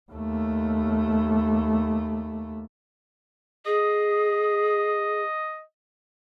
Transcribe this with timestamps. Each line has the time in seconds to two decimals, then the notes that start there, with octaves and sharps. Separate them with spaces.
0.12 D#2 A3
3.66 G#4 D#5